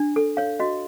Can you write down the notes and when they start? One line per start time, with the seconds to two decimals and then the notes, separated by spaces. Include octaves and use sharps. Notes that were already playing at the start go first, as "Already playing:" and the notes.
Already playing: D4
0.16 A4
0.37 C#5 F5
0.60 F#4 D#5